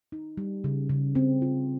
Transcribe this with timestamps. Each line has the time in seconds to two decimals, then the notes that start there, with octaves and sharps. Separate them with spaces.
0.12 D#4
0.37 G3
0.64 C#3
0.89 C#3
1.15 C4
1.42 F4